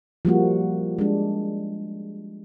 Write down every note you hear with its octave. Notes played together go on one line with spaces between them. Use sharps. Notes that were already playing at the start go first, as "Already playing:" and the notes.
F3 G3 A#3 F#4
G#3 D4